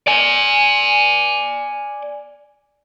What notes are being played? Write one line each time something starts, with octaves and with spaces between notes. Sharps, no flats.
D5 G#5